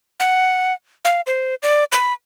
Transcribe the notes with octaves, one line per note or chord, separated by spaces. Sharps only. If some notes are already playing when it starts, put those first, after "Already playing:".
F#5
F5
C5
D5
B5